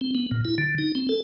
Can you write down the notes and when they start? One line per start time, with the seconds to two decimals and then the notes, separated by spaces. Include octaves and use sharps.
0.01 C4
0.15 B3
0.31 A#2
0.45 E4
0.58 D3
0.78 D#4
0.95 C4
1.09 A4